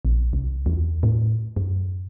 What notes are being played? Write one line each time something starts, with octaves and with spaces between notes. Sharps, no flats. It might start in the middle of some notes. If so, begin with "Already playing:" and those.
A#1
C2
E2
A2
F#2